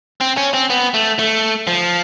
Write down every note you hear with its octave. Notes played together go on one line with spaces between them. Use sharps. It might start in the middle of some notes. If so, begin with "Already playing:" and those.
C4
C#4
C4
B3
A3
A3
F3